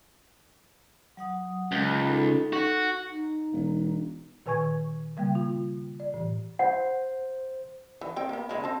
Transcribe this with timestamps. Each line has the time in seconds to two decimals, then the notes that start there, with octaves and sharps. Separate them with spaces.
1.17 F#3 F#5 D#6
1.72 C#2
2.06 D#4 A4
2.53 F#4
3.09 D#4
3.53 E1
4.46 A#2 D#3 B4 G#5 C#6 G#6
5.17 C#3 G3 A#3 G5
5.35 F4
6.00 D5
6.14 A2 E3
6.59 C5 F#5
8.01 E3
8.16 C4 G5
8.29 A#3 B3
8.49 C#3 G#3 E4
8.64 C4 A5